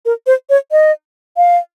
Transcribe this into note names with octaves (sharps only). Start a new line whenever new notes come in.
A#4
C5
C#5
D#5
F5